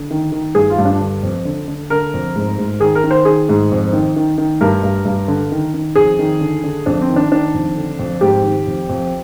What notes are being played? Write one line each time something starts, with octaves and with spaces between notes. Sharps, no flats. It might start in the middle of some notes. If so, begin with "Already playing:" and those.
Already playing: D3
D#3
D#3
G2 G#4
F4
G2
D4
D3
F2
D3
D3
D3 A#4
F2
G#2
G#2
D#3 G#4
A#4
D#3
C5
D#3 G#4
G#2
F2
D#3
D#3
D#3
G2 A#4
G2
G2
D3
D#3
D#3
F2 G#4
D#3
D3
D3
F2 D4
C4
D#3
D4
D#3 D4
F2
D3
F2
G#2 G4
D#3
F2
F2